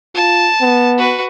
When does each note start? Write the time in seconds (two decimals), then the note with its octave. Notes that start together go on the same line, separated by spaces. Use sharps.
0.15 F4 A5
0.61 B3
0.98 F#4 B4